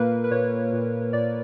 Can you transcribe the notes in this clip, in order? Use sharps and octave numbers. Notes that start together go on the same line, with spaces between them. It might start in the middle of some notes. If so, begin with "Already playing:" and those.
Already playing: A#2 A#3 A#4 B4
B4
A#2 C#5
A#2
A#2 D5